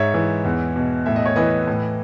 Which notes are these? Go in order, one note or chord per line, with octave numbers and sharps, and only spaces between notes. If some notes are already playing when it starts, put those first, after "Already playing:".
Already playing: G#2 C#5 E5
E3
E2
B2
A2 E5
D#5
C#5
E3 B4 D#5
A2